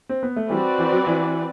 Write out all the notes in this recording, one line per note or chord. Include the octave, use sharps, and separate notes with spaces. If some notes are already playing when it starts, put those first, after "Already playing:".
C4
B3
A3
E3 G3 C4 F#4 B4 D5
E3
F#3
E3